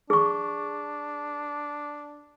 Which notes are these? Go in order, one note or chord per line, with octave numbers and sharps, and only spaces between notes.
D4 G#4 C#6